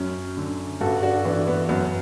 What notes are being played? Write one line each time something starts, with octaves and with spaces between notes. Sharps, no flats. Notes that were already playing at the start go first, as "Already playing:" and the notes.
Already playing: F#2 C#4
D3
G2 F#4 A4
D4 F#4
E3 B3 D4
B3
F#2 B3